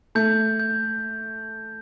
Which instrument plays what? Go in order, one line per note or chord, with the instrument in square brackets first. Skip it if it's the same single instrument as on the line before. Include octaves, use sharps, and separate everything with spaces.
[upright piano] A3 [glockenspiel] G6
[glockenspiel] G6